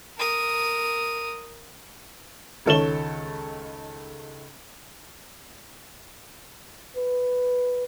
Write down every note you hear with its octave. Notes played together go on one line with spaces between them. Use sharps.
A#4 D#6
C#2 D#3 A4 C#5 E7 G7
B4